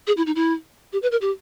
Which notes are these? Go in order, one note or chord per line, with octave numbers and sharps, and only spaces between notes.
G#4
E4
D#4
E4
G4
B4
A#4
G4